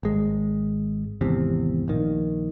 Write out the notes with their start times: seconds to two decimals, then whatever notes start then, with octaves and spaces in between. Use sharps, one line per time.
0.03 G#1 G#3
1.21 G#1 E2 C3
1.88 A#1 D#3